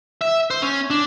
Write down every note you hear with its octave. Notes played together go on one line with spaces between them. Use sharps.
E5
C5
C#4
D4